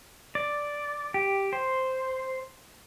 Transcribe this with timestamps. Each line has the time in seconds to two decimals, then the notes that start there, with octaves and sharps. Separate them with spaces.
0.35 D5
1.14 G4
1.53 C5